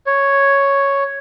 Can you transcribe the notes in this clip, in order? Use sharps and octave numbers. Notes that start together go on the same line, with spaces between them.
C#5